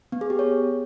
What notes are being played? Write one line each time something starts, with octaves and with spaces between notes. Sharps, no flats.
B3
G#4
G4
C#5